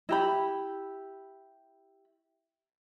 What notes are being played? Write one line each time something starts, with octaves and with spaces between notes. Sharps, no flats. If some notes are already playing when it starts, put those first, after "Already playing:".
E4 G4 B5